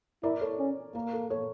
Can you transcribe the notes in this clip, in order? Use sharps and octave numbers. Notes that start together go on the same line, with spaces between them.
E4 A#4 D5
A4 C#5
C#4
A#3 A#4
A4
A4 C#5